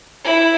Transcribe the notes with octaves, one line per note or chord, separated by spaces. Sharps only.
E4